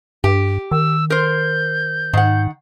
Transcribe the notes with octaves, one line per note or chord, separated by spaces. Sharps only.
G2 G4
D#3 E6
A#4 C5 G6
G#2 D#3 F#5